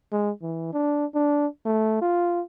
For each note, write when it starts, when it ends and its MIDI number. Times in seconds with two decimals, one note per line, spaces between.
0.12 0.31 56
0.42 0.70 52
0.73 1.05 62
1.15 1.46 62
1.66 2.01 57
2.02 2.41 65